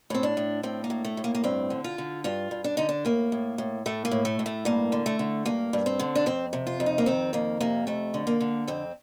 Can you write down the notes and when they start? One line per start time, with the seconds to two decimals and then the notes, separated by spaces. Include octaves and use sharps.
0.10 A2 C4
0.23 D4
0.37 A2
0.63 A2 C4
0.84 A#3
0.90 A2
1.04 A3
1.17 A2
1.24 A#3
1.35 A#3
1.44 G2 C4
1.70 D3
1.84 F4
1.98 D3
2.24 G2 F4
2.51 G2
2.64 D4
2.77 D3 D#4
2.89 D4
3.05 A2 A#3
3.32 A2
3.58 A2
3.86 A2 A3
4.05 A#3
4.11 A2
4.25 A3
4.39 A2
4.46 A3
4.65 G2 A#3
4.92 D3
5.06 A3
5.19 D3
5.45 G2 A#3
5.73 G2
5.86 C4
5.99 D3
6.15 D4
6.26 F2 C4
6.53 C3
6.67 F4
6.80 F2
6.86 D#4
6.98 A#3
7.06 D#3 C4
7.33 F2 A#3
7.61 C3 A#3
7.87 F2 A3
8.14 D3
8.27 A#3
8.40 D3
8.67 F2 C4